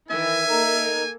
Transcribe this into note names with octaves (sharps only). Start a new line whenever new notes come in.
D#3 E3 A#4 E5 G#5
A#3 D#4 A4 A#4